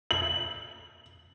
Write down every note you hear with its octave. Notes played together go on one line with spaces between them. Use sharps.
F#7